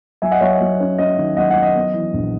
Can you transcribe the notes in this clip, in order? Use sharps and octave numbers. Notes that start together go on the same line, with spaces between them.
F#3 E5 G#5
D#5 F#5
F#3 C#5 E5
D#5
F#3
C#4
C#4 D#5
D#3
F#3 D#5 F#5
D#5 F#5
F#3
D#5
B3
E3
A#1